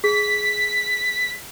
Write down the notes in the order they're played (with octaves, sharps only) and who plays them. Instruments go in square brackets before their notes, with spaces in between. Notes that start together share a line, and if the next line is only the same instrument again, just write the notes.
[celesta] G#4 [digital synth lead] B6